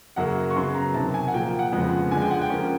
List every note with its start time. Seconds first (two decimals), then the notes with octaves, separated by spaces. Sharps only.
0.16 F#2 C#3 F#3 A#3 F#5
0.51 C#6
0.56 C#3 F#3 B3 C6
0.75 A#5
0.94 C3 D#3 F#3 A5
1.14 G#5
1.28 F#5
1.33 A#2 F3 A#3 G5
1.59 F#5
1.72 F2 C#3 F3 G#3 B3
2.11 D3 F3 G#3 G#5
2.22 G5
2.31 F#5
2.41 G5
2.50 F3 A#3 C#4